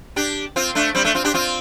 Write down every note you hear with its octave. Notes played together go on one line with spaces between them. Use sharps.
D4 G4
C4 F4
A3 D4
G3 C4
A3 D4
C4 F4
D4 G4
C4 F4